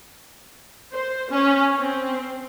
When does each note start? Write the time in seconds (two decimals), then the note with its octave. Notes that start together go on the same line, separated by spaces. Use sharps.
0.94 C5
1.31 C#4
1.80 C4